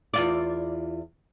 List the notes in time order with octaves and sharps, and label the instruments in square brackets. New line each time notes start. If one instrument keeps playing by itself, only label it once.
[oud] E2 F4 D5